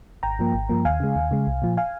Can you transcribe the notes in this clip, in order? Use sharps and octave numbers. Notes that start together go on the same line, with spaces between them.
G#1 G5 A#5
G2 F3 A#3
G#1
G2 F3 A#3
D#2 F5 G#5
C#3 G#3
D#2
C#3 G#3
C2
A#2 F3
F5 G#5